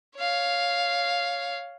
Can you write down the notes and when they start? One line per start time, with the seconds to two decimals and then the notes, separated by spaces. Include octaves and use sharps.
0.16 C#5 F5